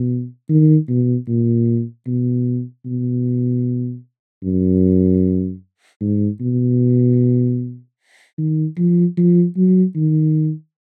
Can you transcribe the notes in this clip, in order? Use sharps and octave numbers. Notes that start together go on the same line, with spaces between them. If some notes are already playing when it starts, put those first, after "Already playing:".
Already playing: B2
D#3
B2
A#2
B2
B2
F#2
G#2
B2
D#3
F3
F3
F#3
D#3